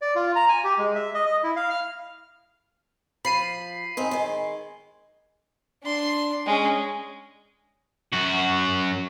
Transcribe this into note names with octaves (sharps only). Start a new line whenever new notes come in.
D5
F4
A#5
G#5
G4
G#3
E5
D#5
D#5
E4
F5
F6
F3 B5 C7 D#7
G#2 C4 D#4
D#3 G#3
D4 C6
G#3 C#4
F#2 F#4